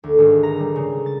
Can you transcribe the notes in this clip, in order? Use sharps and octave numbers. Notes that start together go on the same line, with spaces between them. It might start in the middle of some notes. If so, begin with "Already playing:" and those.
D2
G#1
A#5
G3
C#3
A6